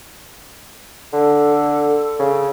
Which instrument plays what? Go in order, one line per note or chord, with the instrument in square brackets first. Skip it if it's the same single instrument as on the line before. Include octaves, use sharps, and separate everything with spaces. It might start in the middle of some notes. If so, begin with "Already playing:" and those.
[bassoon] D3 [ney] A4
[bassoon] C#3